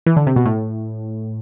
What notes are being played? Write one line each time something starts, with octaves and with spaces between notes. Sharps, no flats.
E3
D3
C3
B2
A2